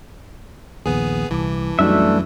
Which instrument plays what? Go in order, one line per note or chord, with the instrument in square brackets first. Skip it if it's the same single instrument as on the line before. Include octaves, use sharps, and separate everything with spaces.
[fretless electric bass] A#1 D#2 [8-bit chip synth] B3 G#4
[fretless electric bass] C2 [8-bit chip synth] E3 [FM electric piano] A5 D6
[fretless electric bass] F#2 [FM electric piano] G3 D#4 F#4 [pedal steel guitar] A3 D4 E5